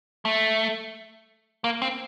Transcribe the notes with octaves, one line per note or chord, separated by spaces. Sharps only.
A3
A#3
C4